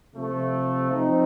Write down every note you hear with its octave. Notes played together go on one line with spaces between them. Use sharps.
C3 F3 A3
F3 C4 D#4